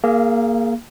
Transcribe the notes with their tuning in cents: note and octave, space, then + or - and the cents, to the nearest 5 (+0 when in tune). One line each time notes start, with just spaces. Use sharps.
A#3 +0 G#4 +10 F5 -40